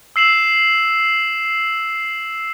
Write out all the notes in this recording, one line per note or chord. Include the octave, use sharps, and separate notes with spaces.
E6 C7 E7 F#7